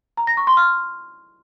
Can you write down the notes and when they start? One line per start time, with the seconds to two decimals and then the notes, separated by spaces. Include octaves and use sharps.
0.17 A#5
0.27 A#6
0.37 C#6
0.47 C6
0.57 F6